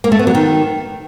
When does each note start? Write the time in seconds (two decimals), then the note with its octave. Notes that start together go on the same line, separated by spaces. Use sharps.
0.04 A#3
0.12 A3
0.19 B3
0.27 F#3
0.35 D#3